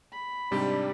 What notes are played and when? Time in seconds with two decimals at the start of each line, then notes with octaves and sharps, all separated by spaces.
0.12 B5
0.52 G#2 C3 G3 D4 G4